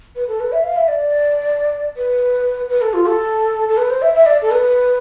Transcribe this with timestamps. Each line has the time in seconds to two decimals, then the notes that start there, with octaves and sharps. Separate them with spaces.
0.16 B4
0.28 A4
0.40 B4
0.52 E5
0.64 F5
0.76 E5
0.88 D5
1.97 B4
2.69 B4
2.81 A4
2.94 F4
3.06 A4
3.69 A4
3.77 B4
3.90 C5
4.02 E5
4.14 E5
4.26 D5
4.42 A4
4.51 B4